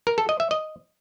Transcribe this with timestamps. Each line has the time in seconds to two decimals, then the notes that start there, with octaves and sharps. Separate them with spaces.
0.07 A#4
0.18 A4
0.29 D#5
0.40 E5
0.51 D#5